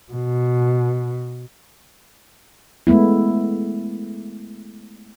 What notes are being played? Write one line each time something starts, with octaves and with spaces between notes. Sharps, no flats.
B2
G#3 A3 B3 E4